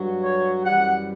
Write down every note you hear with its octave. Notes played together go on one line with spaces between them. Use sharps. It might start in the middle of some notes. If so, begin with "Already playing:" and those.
Already playing: G2 F#3
C#5
F#2 E3 G3 F#5